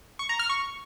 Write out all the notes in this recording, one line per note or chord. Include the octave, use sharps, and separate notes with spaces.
C#6
A#5
F6
C#6